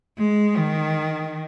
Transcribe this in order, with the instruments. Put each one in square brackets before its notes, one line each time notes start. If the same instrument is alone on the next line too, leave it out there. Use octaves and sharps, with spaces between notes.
[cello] G#3
D#3